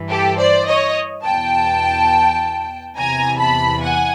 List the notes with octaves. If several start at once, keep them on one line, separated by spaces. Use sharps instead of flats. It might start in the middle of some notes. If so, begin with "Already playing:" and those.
Already playing: G2 E3
G4 A4
C5 D5
C#5 D#5
E2 B2 G5 A5
E2 C3 E3 G#5 A#5
A5 B5
F#5 G#5